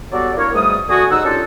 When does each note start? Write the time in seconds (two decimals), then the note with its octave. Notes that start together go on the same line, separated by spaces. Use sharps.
0.13 F#3 G3 B3 F#4 A4 D5
0.37 A#3 D4 E4 A#4 C#5
0.54 G#2 B2 G3 A3 D#6
0.89 D3 F#4 G#5 D#6
1.11 D#2 G#3 D#4 F#5 E6
1.25 C#4 D4 F4 G4 A4